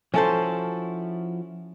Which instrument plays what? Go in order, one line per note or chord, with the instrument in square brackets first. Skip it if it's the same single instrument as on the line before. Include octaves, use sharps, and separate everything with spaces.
[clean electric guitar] F3 E4 F#4 [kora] C#4 A4 C5